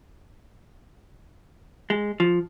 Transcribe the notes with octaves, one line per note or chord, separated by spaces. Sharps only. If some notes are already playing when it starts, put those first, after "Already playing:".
G#3
F3